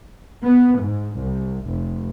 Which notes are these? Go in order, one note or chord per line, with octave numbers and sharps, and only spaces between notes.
B3
G#2
C2
F1